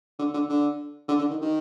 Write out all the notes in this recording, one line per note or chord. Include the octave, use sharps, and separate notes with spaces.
D3
D3
D3
D3
D3
D#3
D#3